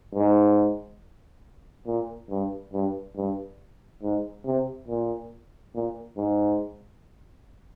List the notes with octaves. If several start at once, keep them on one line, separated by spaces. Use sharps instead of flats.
G#2
A#2
G2
G2
G2
G#2
C3
A#2
A#2
G#2